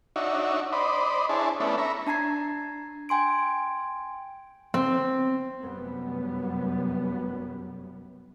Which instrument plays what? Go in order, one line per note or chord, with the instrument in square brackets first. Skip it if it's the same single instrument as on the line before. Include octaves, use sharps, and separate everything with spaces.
[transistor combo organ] D4 D#4 F#4 C#5 E5
C5 D5 D#5 B5
D4 E4 G#4 C5 C#5 A5
A3 B3 C#4 D4 E4
E5 A#5 B5 C#6
[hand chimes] D4 A5 A#5 G#6 C7
G5 G#5 C6 D7
[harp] C4
[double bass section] F1 F#2 F#3 G3 B3